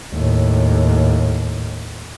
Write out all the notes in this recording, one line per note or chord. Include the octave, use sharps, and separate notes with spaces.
D#2 A2